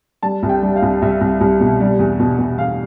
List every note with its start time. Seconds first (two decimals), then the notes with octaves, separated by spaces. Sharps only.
0.23 G3 A5
0.43 C2
0.49 G5
0.63 G3
0.76 F5
0.82 C2
1.02 C2 E5
1.21 C2
1.41 C2
1.60 B2
1.80 G3
1.99 E2
2.19 B2
2.38 B2
2.58 E2 F5